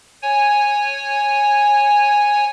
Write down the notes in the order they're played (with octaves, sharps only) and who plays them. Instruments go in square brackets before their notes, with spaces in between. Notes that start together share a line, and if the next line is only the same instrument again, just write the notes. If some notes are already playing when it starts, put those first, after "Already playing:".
[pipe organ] C#5 G#5